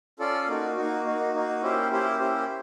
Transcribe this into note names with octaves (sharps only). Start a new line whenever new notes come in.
C#4 F4 A4 D5
A#3 D#4 F#4
A#3 D#4 F#4
A#3 D#4 F#4
A#3 D#4 F#4
A#3 C#4 E4 G4 C5
A#3 C#4 E4 G4 C5
A#3 C#4 E4 G4 C5